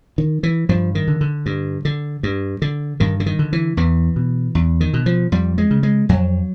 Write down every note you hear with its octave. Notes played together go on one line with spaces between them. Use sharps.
D#3
E3
G2 F3
D#3
D3
D3
G2
D3
G2
D3
G2 D#3
D3
D#3
D3
E3
E2 E3
B2
E2
D#3
B2
F3
F2 G3
G#3
C#3
G#3
F2 F#3